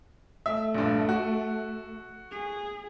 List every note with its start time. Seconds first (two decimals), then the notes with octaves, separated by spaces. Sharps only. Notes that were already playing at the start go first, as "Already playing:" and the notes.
0.46 A3 E5
0.75 A#1 G2
1.09 F#4
2.32 G#4